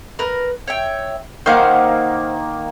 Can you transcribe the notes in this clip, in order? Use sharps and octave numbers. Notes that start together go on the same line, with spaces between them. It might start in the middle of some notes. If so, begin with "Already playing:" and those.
A#4 B4
C#5 E5 G5
D#3 A#3 C5 F5 F#5